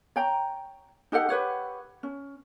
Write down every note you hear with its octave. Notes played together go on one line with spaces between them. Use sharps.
C#5 G5 A#5
D#4 G4 A4 F#5
G4 B4 C#5 F#5
C#4